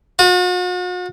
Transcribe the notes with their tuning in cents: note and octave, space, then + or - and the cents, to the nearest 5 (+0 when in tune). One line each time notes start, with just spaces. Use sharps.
F#4 -45